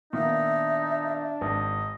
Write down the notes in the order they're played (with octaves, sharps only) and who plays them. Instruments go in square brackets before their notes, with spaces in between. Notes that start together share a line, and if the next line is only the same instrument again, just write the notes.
[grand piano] A#2 D#3 B3 [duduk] D4 [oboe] D#4 [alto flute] E5
[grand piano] G#1 [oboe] D#5